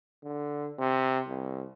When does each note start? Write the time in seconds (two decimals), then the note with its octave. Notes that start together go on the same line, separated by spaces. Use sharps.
0.23 D3
0.78 C3
1.28 C2